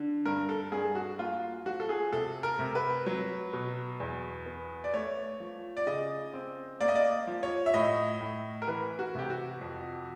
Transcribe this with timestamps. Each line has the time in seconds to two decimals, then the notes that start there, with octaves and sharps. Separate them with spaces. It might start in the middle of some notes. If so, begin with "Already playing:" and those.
Already playing: D3
0.25 G2 A#4
0.49 A4
0.72 G2 G#4
0.95 F#4
1.19 A#3 F4
1.66 F3 F#4
1.80 A4
1.89 G#4
2.12 C3 A4
2.43 A#4
2.59 C3
2.75 B4
3.06 F#3
3.53 B2
4.00 E2
4.46 B3
4.84 D5
4.93 A3 C#5
5.40 F3
5.77 D5
5.86 C#3 D#5
6.33 C4
6.81 A#3 D5
6.88 D#5
6.95 D5
7.27 F3
7.43 C#5
7.66 E5
7.74 A2 D#5
8.21 A2
8.62 A#4
8.68 E3 B4
8.99 F#4
9.15 C3 G4
9.30 F#4
9.61 F2